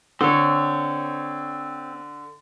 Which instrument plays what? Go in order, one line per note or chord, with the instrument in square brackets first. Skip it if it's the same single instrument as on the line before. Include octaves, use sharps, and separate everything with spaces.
[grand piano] D3 [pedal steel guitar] C4 C#5